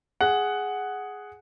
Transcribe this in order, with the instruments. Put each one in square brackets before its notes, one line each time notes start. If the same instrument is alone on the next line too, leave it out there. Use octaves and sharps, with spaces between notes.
[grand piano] G#4 F#5